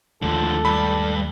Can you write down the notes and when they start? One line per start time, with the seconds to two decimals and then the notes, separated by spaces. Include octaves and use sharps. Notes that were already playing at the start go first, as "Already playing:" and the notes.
0.22 D#2 D3 F3 G#3 A3 A4
0.65 G2 B5